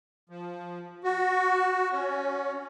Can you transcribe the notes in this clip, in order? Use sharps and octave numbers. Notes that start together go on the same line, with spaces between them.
F3
F#4
C#4